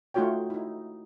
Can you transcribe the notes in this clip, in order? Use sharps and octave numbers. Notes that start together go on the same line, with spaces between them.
A3 D#4 F4 F#4 C#5 G5
D#4 E4